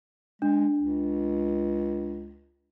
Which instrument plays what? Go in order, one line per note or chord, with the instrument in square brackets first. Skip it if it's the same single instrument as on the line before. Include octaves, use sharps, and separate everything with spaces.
[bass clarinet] G#3 [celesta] D4
[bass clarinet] C#2